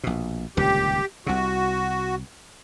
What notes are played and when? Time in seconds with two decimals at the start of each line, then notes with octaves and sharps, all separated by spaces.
0.04 A#1 B2
0.57 D#1 C#2 D3 G4
1.26 C2 C3 F#4